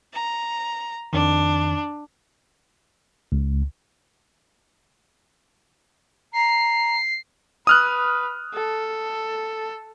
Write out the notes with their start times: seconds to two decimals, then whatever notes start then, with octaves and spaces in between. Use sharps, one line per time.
0.13 A#5
1.13 F2 D#3 D4
3.32 C#2
6.33 A#5 C7
7.67 B4 D#6 F6 F#6
8.54 A4